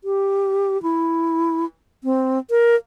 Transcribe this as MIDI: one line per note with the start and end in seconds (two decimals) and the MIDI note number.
0.04 0.81 67
0.83 1.65 64
2.04 2.39 60
2.50 2.76 70